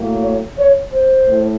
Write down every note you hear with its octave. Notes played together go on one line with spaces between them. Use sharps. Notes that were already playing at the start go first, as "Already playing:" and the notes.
Already playing: A2 F#3 A#3
C#5
C#5
C5
A2